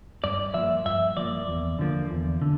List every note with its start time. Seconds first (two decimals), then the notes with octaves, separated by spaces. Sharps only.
0.24 G2 D5
0.54 F3 A#3 E5
0.86 G2 E5
1.17 F3 A#3 D5
1.48 E2
1.79 D3 F3 A#3
2.11 E2
2.42 D3